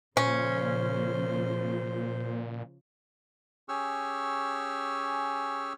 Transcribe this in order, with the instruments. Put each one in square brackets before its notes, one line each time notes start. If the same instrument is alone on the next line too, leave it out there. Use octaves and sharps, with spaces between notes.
[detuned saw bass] A#2 [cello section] C#3 F3 [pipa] C#4 [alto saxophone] C5
[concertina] C#4 G4 G#4 C#6 E6 F6